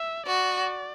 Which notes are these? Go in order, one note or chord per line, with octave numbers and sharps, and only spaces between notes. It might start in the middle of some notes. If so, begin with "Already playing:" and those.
Already playing: E5
F#4 D5